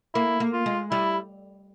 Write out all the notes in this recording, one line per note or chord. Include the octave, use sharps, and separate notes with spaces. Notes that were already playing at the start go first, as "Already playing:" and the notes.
A#3 E4
A#3
F4
G#3
G3 E4